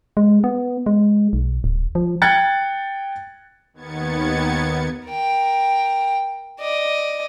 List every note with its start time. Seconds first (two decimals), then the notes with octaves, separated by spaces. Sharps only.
0.17 G#3
0.44 B3
0.86 G#3
1.33 B1
1.64 D1
1.95 F3
2.22 G5 F#6 G#6 A6 C#7
3.73 D#2 D#3 B3 G#6 A6 C#7
5.08 A#4 G5
6.60 D5 D#5